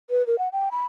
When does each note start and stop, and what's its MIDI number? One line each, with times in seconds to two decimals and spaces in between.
0.10 0.25 71
0.27 0.38 70
0.38 0.49 78
0.52 0.69 79
0.71 0.86 83